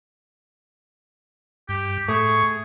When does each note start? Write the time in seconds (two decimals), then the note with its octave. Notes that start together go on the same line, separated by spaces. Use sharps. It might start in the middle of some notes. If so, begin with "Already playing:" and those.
1.69 G2 G4 G6
2.08 A2 A3 G#4 C#6